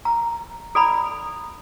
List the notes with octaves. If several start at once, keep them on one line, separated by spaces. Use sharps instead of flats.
A#5
A4 D5 A#5 B5